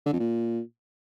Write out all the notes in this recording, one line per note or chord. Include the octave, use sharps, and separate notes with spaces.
D3
F2
A#2